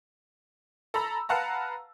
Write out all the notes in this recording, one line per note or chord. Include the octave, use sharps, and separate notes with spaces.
A4 A#5 B5 E6
B4 F5 F#5 A5 A#5